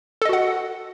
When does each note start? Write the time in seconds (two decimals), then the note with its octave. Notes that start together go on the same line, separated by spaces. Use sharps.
0.22 A4
0.25 D#5
0.29 F#4
0.33 F#5